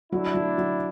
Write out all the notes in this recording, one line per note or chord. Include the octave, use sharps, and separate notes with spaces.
F#3 D4 E4
F#3
F#3